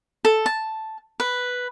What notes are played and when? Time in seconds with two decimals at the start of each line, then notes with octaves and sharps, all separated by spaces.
0.25 A4
0.46 A5
1.20 B4